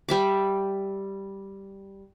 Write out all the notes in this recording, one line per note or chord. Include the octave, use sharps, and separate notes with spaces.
G3 E5 D6